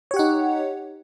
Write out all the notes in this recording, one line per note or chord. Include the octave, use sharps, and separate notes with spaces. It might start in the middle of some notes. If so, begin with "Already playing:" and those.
D#4 G4 C#5 F#5